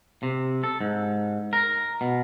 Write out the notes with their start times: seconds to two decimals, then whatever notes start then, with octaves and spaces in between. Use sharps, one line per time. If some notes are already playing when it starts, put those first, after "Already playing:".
0.23 C3
0.64 A4
0.81 G#2
1.53 A#4
2.01 B2